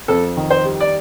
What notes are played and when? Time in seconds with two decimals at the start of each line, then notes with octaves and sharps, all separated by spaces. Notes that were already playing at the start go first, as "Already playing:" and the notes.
0.08 F2 A4
0.37 D#3
0.50 C5
0.65 G3
0.80 D5